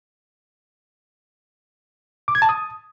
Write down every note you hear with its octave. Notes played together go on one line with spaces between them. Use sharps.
D6
G#6
A5
D#6